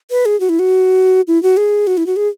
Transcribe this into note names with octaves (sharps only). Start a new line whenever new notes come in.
B4
G#4
F#4
E4
F#4
E4
F#4
G#4
F#4
E4
F#4
G#4